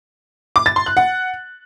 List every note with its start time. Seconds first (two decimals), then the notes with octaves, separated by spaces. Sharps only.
0.56 D6
0.66 A6
0.76 C6
0.86 F#6
0.97 F#5